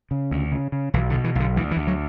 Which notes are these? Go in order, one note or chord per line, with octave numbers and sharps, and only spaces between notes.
C#3
D2
C#3
C#3
B1 E3
D3
B2
E3
B1 D3
D2 E3
E3
D2
F#3